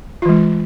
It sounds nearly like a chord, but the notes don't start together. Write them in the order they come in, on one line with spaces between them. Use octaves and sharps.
F4 E3 G#3